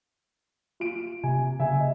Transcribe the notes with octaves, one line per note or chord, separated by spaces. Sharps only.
F4 D7
C3 G#5
C#3 E5 G#5
D#5